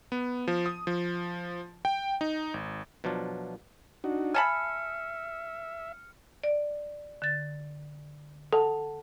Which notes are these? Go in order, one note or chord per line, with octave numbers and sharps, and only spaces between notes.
B3
F3
D#6
F3
G5
D#4
G#1
B2 F3 F#3 D4 F4
D4 D#4 F#4
E5 G#5 A5 B5 F6 C#7
D5
D3 A6
A4 F#5 A5